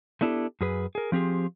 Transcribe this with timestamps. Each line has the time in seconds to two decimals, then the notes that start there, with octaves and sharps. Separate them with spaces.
0.21 A3 B3 D4 E4 G4 A4
0.61 F#2 G#4 B4
0.95 G#4 A#4
1.12 F3 C4 G4 G#4